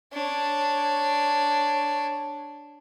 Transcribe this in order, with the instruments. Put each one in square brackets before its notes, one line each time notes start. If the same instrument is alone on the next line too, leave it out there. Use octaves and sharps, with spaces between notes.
[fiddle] D4 C#5